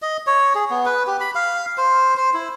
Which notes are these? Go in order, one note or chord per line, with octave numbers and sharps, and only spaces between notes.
D#5
C#5
G#4
B3
B4
G4
B5
F5
C5
C5
E4